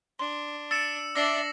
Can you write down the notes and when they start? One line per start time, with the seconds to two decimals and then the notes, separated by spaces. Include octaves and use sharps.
0.19 D4 C6
0.71 E6 A6 C#7 D7 E7
1.15 D4 D5 E5 E6 A#6 C7 F#7